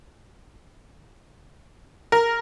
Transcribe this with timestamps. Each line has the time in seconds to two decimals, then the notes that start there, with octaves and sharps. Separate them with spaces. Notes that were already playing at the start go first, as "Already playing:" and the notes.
2.12 A#4